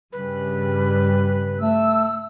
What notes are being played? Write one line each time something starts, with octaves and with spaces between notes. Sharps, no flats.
G2 C#3 G3 B4
A3 E6